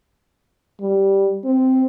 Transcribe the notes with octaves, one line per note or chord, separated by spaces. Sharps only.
G3
C4